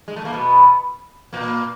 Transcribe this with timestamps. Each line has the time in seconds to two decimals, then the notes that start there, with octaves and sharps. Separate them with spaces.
0.08 G#3
0.16 A3
0.25 A#3
0.33 B2 B3
1.33 A#2 A#3